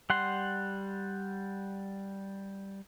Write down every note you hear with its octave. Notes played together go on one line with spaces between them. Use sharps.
G3 F#5 C6